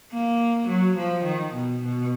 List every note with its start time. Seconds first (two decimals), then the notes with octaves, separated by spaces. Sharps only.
0.13 A#3
0.69 F#3
0.97 F3
1.25 D#3
1.54 B2
1.83 B2